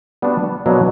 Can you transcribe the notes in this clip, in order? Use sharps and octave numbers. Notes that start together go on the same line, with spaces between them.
G3 B3 D4 F#4
B2 F#3 A#3 D4